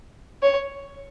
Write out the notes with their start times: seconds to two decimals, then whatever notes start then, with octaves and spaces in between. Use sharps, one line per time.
0.42 C#5